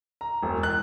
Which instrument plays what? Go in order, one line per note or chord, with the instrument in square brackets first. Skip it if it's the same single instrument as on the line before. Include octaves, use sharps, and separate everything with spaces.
[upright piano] A#5
E1
F#6